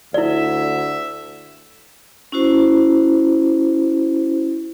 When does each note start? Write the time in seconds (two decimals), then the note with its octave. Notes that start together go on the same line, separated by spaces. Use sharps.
0.14 D2 E4 D5 E5
2.32 C#4 E4 F#4 C5